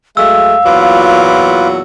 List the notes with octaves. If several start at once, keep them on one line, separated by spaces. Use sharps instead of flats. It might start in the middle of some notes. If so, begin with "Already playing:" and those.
F#3 G#3 A3 F5 E6
E2 A#2 F#3 F4 B4 D6